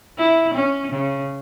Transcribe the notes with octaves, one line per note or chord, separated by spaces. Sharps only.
E4
C#4
C#3